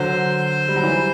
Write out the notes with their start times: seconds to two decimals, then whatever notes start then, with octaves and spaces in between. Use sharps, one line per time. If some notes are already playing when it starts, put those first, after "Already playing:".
Already playing: D3 F#3 C5
0.68 G3
0.76 F#3
0.83 E3 G3